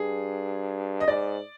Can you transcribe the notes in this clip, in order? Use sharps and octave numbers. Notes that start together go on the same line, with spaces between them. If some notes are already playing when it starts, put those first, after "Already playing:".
Already playing: G2 G#4
D#5
G#2 D5